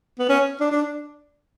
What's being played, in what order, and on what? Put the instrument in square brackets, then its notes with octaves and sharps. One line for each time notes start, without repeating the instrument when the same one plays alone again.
[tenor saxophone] B3
C#4
D4
D4